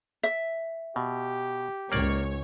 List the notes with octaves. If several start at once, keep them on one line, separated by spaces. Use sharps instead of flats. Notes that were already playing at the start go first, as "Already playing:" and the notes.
E5
B2 G4
C#2 G#2 A#3 C#5 D5